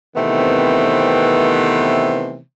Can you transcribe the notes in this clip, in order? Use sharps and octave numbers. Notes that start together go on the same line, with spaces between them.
C3 D#3 E3 A3 B3 C4